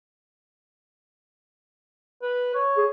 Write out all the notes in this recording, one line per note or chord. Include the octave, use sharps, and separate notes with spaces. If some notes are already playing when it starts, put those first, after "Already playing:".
B4
C#5
G#4